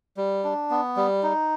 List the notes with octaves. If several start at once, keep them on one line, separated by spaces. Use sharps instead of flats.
G3
D4
B3
G3
D#4